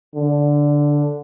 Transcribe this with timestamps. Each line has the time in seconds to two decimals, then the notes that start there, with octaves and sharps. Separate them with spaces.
0.15 D3